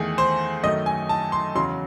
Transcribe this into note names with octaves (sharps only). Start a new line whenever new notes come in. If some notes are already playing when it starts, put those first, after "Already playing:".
Already playing: E2 D#3 A3 G#4
C5
F#2 D#3 A3 D#5
G#5
A5
C6
E2 C#3 F#3 C6